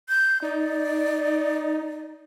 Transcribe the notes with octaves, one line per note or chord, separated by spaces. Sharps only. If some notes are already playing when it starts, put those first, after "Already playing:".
G6
D#4 D5